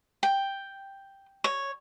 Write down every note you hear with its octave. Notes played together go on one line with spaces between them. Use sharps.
G5
C#5